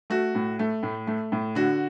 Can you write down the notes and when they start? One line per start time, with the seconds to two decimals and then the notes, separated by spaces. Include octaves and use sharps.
0.10 A3 F#4
0.35 A2
0.59 A3
0.83 A2
1.07 A3
1.32 A2
1.55 D3 F#4